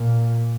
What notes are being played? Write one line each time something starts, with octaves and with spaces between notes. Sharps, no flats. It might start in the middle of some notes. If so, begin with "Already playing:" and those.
Already playing: A#2